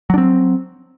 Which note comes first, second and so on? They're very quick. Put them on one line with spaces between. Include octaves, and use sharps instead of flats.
F#3 D4 C4